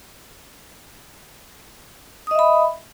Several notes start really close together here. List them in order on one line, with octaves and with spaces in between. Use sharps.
D#6 D#5 E5 B5